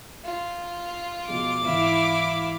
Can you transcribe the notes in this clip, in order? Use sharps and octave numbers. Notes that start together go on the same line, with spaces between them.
F4
B2 F3 G#3 D6
G#1 E3 E4 F5